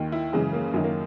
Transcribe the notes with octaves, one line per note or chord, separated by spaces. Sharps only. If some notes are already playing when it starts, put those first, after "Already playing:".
Already playing: D#2 D#3
E4
F#2 C#3 E3 G#3
A#3
F#2 D#3 F#3
A#3